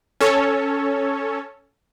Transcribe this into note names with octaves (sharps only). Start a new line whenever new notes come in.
C#4 A4 C#5